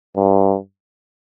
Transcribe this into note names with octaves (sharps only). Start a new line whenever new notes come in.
G2